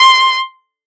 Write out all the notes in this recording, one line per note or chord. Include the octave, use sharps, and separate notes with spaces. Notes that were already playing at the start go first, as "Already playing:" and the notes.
Already playing: C6